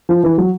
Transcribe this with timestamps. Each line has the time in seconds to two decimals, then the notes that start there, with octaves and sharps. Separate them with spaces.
0.09 F3
0.23 E3
0.38 F#3